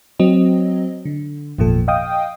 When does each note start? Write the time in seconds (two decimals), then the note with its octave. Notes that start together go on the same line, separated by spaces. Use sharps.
0.19 F#3 C4 D#5
1.05 D3
1.58 G#1 E2 A#2 F3 A4
1.88 D#5 F5 G5 D#6